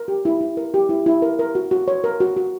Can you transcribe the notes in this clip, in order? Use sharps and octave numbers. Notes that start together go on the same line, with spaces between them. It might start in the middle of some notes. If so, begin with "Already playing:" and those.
Already playing: A#4
G4
E4
E4
A#4
G4
E4
E4
A#4
A#4
F#4
F#4
C#5
A#4
F#4
F#4